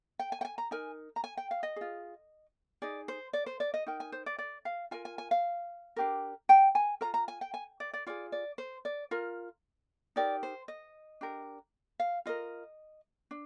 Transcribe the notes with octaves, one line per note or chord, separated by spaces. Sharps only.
G5
G#5
G5
G#5
A#5
D#4 A#4 G#5
A#5
G#5
G5
F5
D#5
F4 G#4
D#4 G#4 D5
C5
D5
C5
D5
D#5
D#4 A#4 G5
G#5
C5
D5
D5
F5
F4 A#4 G#5
G#5
G#5
F5
D4 G4 A#4
G5
G#5
F4 A#4 A#5
A#5
G#5
G5
G#5
D5
D5
F4 G#4 D5
D5
C5
D5
F4 A#4
D#4 G4 A#4 D5
C5
D#5
D4 G4 A#4
F5
F4 A#4 D#5
D4